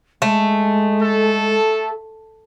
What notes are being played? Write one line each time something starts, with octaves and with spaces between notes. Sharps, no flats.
G#3 A3
A4